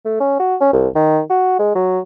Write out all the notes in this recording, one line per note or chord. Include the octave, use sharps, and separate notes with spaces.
A3
C#4
F#4
C#4
C2
D#3
F#4
G#3
F#3